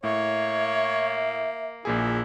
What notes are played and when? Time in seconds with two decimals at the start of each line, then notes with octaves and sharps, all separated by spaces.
0.04 A2 A#3 C#5 E5
1.85 A#1 A#2 E4 G#4